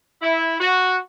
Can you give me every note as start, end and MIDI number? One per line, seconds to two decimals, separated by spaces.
0.22 0.56 64
0.60 0.97 66